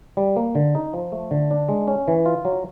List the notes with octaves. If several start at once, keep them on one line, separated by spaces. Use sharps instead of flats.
G3
A#3
D3
D#4
F3
A3
D3
D4
G#3
C#4
E3
F4
F#3